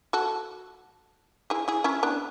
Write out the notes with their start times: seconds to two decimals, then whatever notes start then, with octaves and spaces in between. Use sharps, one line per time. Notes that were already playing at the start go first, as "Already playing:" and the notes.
0.13 F#4 A4
1.50 E4 G#4
1.68 E4 G#4
1.84 C#4 E4
2.03 B3 D4